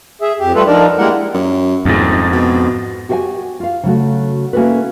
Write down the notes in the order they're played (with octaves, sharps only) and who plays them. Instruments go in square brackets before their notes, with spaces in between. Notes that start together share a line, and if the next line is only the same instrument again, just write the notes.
[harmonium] G#4 E5
F2 G4
G3 A3 F4 A4 B4
F3 D4 D#4 A#4 D5
G3 G#3 A#3 E4 A#4 F#5
[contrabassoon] F#2
[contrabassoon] D#1 [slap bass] F2 G#2
[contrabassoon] B2
[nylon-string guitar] F#4 G4 B4 F5 F#5 G#5
F4 F5
C#3 F#3 A3 F#4
A#3 C#4 E4 F#4 A4 B4